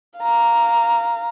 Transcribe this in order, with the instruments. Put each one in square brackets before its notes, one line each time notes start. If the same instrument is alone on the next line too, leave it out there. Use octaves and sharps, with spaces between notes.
[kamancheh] F5 A#5